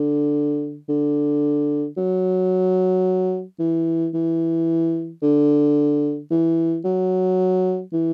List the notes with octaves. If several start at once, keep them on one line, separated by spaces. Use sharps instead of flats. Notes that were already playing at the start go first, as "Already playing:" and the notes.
Already playing: D3
D3
F#3
E3
E3
D3
E3
F#3
E3